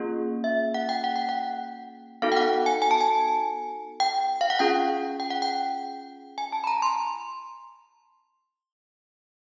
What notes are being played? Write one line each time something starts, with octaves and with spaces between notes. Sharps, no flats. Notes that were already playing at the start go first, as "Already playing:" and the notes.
Already playing: A#3 C#4 F4 G#4
E5
F#5
G5
F#5
G5
F#5
B3 D#4 F#4 A4 F5
G5
F#5
G#5
G#5
A5
G#5
G5
F5
F#5
C#4 F4 G#4 G5
G5
F#5
G5
G#5
A5
B5
A#5
C6